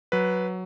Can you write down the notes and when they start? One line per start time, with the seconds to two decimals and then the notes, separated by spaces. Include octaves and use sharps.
0.12 F#3 B4